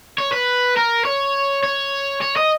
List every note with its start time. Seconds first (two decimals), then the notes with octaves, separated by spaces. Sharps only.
0.18 C#5
0.32 B4
0.77 A#4
1.05 C#5
1.63 C#5
2.22 C#5
2.37 D#5